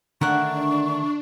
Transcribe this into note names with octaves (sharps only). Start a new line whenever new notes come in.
D3 D#3 A3 D4 A#4 E5 F#5 C#6